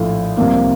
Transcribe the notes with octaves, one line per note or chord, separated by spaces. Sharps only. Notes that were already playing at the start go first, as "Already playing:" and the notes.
Already playing: A#1 A2 F3 A3 F4
C2 C3 F3 A#3